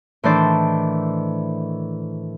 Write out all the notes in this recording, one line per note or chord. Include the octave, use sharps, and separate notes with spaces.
A2 D#3 E3 D4 C5 D5